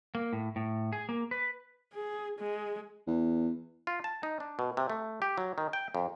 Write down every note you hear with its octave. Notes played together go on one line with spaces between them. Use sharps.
A#3
A2
A2
G#4
A#3
B4
G#4
G#3
E2
F4
A5
D#4
D4
B2
C3
A3
G4
F#3
D#3
G5
F2